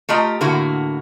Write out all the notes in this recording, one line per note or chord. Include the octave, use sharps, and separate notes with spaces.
A3 F4 G4 D#5 A#5
A2 D3 A#3 E4 F#4